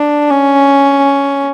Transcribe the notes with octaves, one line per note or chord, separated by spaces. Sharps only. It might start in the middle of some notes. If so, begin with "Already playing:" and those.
Already playing: D4
C#4